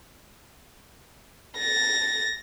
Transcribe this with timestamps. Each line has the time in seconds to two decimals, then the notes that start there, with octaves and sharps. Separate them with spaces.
1.58 A6 A#6